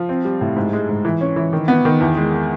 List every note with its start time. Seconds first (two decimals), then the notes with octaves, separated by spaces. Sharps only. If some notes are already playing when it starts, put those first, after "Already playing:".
Already playing: F3
0.09 C4
0.25 G3
0.41 A2
0.57 G#2
0.73 G#3
0.89 G#2
1.05 E3
1.21 C#4
1.36 E3
1.53 D#3
1.68 B3
1.85 D#3
2.01 E2
2.17 G#3